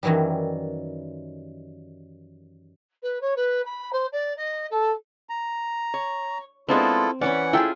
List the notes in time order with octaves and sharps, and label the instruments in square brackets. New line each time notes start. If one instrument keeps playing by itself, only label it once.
[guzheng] F#2 D#3 E3 F#3 G3
[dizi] B4
C#5
B4
B5
C5
D5
D#5
A4
[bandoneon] A#5
[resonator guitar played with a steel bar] C#5
[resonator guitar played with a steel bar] G#3 B3 D4 [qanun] C4 [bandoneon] E4 F4 A4
[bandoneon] E3 F#5 [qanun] C#4 C#5 B5 [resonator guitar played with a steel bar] D5
[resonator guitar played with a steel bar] E4 A4 G5 [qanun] F4 G#4